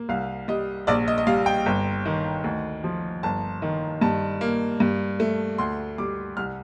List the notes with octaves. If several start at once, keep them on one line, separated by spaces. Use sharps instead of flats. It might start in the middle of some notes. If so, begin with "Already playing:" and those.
Already playing: A#3
C2 F5
G3 D#5
A#1 D5
D#5
D#5
G3 F5
G5
G1
D#3
D2
F3
G1 A5
D#3
G2 A5
A#3
G2
A3
D2 C6
G3 D6
C2 F6